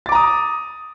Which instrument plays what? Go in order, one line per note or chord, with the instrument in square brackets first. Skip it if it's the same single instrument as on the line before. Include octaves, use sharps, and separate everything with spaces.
[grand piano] A6
D6
A#5
D#6